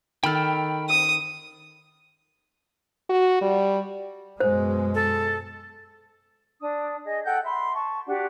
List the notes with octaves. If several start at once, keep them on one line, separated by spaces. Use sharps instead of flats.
D#3 A4 G5 B5 F6
D#6
F#4
G3
F#2 B2 G#3 C5
A4
D4 D#6
G#4 D#5
A4 F#5 G5 G6
E5 B5 C6
A5 C#6
D4 F#4 G4 F#5